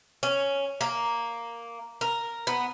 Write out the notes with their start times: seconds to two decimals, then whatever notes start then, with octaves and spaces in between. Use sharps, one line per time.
0.23 C#4
0.81 A#3
2.01 A#4
2.47 B3